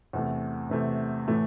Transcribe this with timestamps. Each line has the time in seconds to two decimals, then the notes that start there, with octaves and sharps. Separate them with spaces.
0.13 E2 C3 E3 A3
0.70 E2 C3 E3 A3
1.28 A2 E3 A3